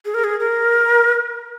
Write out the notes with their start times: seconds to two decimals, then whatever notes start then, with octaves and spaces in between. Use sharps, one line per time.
0.05 G#4
0.14 A#4
0.24 G#4
0.40 A#4